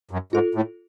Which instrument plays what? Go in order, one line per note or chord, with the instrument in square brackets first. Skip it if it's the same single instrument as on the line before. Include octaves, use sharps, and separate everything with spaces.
[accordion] F#2
[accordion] G#2 [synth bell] F4 A4
[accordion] A2